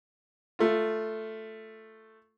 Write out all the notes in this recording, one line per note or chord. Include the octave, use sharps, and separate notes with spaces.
A3 F4